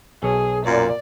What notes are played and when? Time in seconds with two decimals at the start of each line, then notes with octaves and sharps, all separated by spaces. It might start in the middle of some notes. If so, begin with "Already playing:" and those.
0.23 B1 G#4 A4 C#5
0.66 F#2 A#2 D5